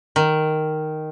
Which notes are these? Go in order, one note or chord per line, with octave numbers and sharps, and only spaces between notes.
D#3